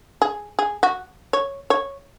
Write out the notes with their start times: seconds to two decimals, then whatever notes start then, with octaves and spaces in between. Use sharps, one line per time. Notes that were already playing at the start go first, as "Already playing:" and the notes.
0.22 G#4
0.59 G#4
0.83 F#4
1.33 C#5
1.70 C#5